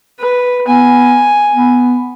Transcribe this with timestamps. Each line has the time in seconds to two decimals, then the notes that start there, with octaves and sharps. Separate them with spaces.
0.20 B4
0.68 B3 G#5
1.52 B3